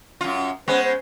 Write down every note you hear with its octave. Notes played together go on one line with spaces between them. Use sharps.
F#2 F4
G#3 B3 C#4 C5
C5